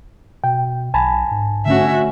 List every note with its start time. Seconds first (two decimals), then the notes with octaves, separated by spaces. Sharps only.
0.44 B2 G5
0.94 B1 G#5 A5 B5
1.31 G#2
1.65 D3 A3 C#4 F#4 E5